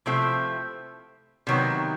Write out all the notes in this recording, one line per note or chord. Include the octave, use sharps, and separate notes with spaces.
C3 F3 A3 C4 E4
C3 D#3 F#3 B3